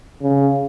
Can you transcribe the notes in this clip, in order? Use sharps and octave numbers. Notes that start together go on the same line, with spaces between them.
C#3